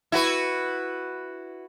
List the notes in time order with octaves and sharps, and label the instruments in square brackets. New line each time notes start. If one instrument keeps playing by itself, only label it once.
[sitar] E4 F#4 B4